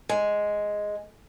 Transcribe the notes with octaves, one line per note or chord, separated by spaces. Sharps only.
G#3